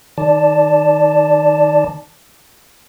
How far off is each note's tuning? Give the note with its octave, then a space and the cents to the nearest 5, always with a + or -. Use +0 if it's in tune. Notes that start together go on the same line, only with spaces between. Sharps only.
D#3 +0 D5 +0 A5 +0